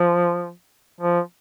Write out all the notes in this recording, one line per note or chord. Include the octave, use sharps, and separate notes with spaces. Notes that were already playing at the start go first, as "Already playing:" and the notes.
Already playing: F3
F3